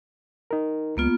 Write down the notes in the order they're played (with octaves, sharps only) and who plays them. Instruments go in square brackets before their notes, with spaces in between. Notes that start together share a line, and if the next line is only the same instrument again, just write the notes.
[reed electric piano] D#4 A#4
[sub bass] C#2 [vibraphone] A#3 B3 F4